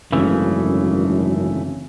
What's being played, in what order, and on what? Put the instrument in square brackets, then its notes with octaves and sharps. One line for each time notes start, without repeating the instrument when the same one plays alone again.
[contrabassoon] G#1 [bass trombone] F#2 [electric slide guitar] C#3 E3 A3